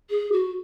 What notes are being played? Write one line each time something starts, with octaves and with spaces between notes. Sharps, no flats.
G#4
F#4